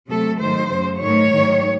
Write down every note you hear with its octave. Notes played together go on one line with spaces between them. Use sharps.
C3 F#3 A3 A4
G#2 D#3 F#3 A3 C5
F#2 C#3 F#3
G#2 D#3 A3 C#5
G#2 D#3 F#3 A3